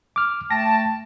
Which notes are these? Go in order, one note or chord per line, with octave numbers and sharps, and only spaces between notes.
D6 F6
A3 G5 A5 A#6